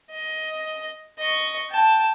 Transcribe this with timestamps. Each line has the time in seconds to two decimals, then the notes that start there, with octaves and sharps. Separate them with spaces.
0.10 D#5
1.19 D#5 C#6
1.70 G5 A5